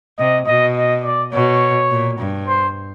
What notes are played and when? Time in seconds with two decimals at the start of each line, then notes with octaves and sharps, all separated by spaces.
0.19 C3 D#5
0.46 B2 D#5
0.75 D#5
1.04 D5
1.33 B2 C#5
1.91 A#2
2.19 G2
2.47 C5